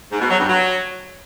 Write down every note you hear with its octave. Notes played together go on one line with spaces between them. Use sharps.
G#2
B2
F#3
G2
F#3